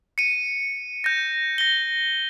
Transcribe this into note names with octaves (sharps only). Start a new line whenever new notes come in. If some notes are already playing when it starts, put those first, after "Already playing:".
C#7 D#7
G6 A#6
A#6 G7